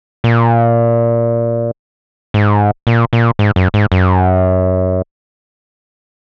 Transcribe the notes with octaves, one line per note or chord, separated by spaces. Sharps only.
A#2
G#2
A#2
A#2
G#2
F#2
G#2
F#2